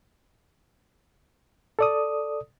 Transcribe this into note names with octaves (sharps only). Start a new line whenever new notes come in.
A4 D5 D#6